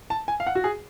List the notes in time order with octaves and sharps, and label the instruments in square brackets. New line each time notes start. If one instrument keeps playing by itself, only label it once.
[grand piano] A5
G#5
F5
F#5
F#4
G#4